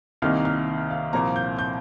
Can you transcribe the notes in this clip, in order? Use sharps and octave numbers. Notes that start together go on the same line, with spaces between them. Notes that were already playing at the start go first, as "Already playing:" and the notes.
C2 C3 D#3 A#3 D#4 F6
F6
F5
C2 A#2 F3 A#3 A#5
G6
G6